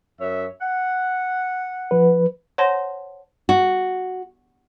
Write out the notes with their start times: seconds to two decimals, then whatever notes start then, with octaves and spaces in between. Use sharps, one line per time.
0.21 F#2 C#5 E5
0.61 F#5
1.91 F3 B4
2.58 C5 C#5 F#5 A5 C6 A#6
3.49 F#4